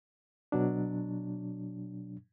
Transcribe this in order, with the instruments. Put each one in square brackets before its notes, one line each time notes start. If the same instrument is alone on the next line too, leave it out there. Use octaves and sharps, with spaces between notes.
[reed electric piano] B2 F#3 D4